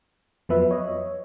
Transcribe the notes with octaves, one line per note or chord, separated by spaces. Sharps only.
F2 F3 F#3 B3 B4 E5
C#5 D#5